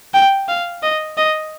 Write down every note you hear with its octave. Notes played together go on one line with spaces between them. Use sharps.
G5
F5
D#5
D#5